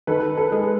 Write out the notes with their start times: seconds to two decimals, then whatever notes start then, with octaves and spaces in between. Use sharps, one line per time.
0.07 D#3 A4 B4
0.37 A4 B4
0.52 G#3